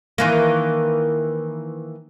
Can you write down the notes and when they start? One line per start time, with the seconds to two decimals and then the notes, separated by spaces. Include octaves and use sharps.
0.18 D#3 E3 A#3